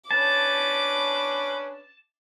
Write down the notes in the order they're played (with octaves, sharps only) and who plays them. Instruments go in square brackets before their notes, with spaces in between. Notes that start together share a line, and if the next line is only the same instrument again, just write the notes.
[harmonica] C#4 D4 B4 [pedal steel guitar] A5 [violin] D6